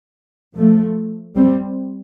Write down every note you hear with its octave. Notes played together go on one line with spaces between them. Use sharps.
F3 A3
G3 C4